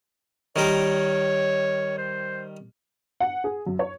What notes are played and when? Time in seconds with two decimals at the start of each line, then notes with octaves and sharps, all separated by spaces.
0.56 D#3 G3 A#4 C#5
1.98 C5
3.20 F#5
3.44 G#4
3.66 F#2
3.79 C#5